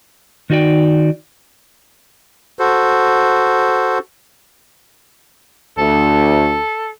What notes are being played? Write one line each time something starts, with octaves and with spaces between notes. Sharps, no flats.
D#3 D#4 F#4 D5 G5
F#4 A4 C5
D2 A4